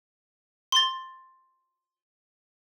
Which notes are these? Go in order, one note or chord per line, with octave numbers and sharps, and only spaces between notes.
C6 A6